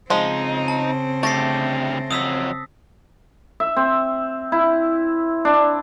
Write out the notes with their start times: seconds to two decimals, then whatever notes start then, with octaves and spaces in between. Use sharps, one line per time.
0.10 C#3 F3 G#3 C4 D#4
0.68 A5
1.23 D2 A3 G4 A6 A#6 C7
2.11 F2 F#3 D#6 E6 B6
3.60 E5
3.77 C4
4.52 E4
5.45 D4